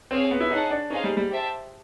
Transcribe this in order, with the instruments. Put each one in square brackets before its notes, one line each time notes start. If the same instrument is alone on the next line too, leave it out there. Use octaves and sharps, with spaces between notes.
[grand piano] C4 [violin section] G#4 C#5 F5
[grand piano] B3
E4
[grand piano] D#4 [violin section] G#4 C#5 F#5 A5
[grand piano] D4
[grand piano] C#4 [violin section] D#4 G#4 C5 F5
[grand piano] G3
G3
[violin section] G4 C5 E5 A5